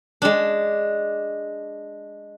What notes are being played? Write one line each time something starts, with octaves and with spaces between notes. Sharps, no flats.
G#3 D4